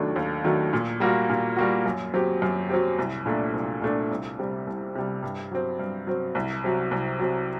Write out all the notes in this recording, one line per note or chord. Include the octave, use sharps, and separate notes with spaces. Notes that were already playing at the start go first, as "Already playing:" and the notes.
Already playing: D#2 D#3 F#3 A3 D4
D#2
D#3 F#3 A3 D4
A#2
G3 A#3 F#4
A#2
G3 A#3 F#4
F#2
F#3 C4 G4
F#2
F#3 C4 G4
C2
A#2 A3 D4
C2
A#2 A3 D4
C2
C3 G3
C2
C3 G3
G2
F#3 C4
G2
F#3 C4
C2
C3 F#3
C2
C3 F#3